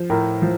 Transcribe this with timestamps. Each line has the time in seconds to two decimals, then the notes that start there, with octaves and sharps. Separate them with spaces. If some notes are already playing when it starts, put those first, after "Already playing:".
Already playing: F3
0.10 A2 A#4
0.42 F3